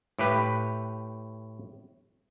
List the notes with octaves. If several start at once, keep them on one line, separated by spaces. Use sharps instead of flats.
A2 G4 B4